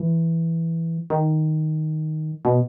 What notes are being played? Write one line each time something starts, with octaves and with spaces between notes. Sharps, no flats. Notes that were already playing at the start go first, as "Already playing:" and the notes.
Already playing: E3
D#3
B2